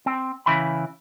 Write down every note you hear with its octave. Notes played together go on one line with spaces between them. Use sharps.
C4
C#3 E3 B5